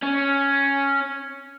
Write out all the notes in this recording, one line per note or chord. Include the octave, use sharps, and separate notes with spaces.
C#4